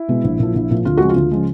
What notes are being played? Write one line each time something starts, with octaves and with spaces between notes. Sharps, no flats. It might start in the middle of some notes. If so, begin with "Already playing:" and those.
Already playing: E4
B2 G#3
A#1
A#2 F3
A#1
A#2 F3
D2 F4
C#3 F3 G#3 F#4
F4
D2
C#3 F3 G#3